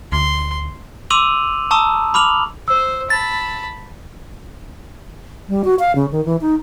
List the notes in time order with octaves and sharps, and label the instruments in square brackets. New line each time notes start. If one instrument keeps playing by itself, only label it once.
[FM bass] D2 [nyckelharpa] C6
[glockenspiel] C6 D6 E6 D#7 F7 F#7
A5 A#5 C#6 D#6 E6
B5 D6 F6 F7 F#7
[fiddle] C5 [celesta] E6
[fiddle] A5 B5 [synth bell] A6
[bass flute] G3
F#4
F5
C#3
D#3
E3
D#4